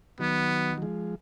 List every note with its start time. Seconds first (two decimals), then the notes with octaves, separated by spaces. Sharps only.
0.19 D#3 F#3 B3
0.78 F#3
0.82 F3 G#3